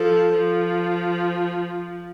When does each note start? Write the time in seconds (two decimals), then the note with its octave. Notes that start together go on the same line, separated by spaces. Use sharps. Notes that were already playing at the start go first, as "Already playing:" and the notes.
Already playing: F3 A4
0.33 F3